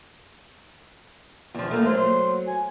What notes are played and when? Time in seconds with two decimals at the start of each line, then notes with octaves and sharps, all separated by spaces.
1.55 E2 F3
1.71 A3 A#3
1.86 F#3 C5
2.47 G#5